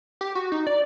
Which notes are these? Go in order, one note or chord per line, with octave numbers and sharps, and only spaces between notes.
G4
F#4
D#4
D5